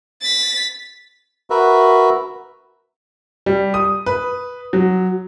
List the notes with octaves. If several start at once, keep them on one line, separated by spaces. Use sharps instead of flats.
A6 B6
F#4 A#4 B4 E5
G3
D#6
B4
F#3